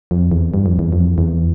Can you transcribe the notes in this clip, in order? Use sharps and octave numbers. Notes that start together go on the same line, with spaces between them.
F2
E2
G2
F2
E2
F2
E2